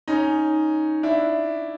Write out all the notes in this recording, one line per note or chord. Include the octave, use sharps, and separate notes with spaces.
C#4 D#4
D4 E4